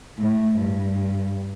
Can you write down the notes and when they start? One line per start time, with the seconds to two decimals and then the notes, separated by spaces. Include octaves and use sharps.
0.19 A2
0.59 G2